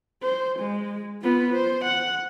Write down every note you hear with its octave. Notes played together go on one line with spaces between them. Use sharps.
C5
G#3
B3 F4
C5
F#5